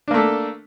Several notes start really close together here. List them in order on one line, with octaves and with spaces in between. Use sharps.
D4 A#3 A3 A4